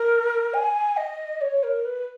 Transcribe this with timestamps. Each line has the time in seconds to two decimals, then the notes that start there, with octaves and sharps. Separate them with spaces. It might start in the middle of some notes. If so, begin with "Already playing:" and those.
Already playing: A#4
0.54 G#5
0.97 D#5
1.41 C#5
1.63 A#4
1.85 B4